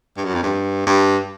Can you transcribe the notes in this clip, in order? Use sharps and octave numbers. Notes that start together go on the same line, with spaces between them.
G2
F#2
F2
G2
G2